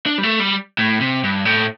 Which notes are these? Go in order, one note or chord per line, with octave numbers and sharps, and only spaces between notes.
D4
G3
A3
G3
A2
C3
G2
A2